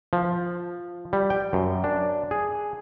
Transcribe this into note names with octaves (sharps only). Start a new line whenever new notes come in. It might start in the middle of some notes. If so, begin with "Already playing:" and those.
F3
G3
G5
F#2
D4
G#4